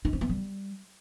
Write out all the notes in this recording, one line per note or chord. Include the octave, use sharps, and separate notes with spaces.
D#4
C4
B3
G3